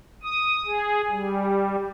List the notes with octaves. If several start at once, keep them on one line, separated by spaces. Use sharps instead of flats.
D#6
G#4
G3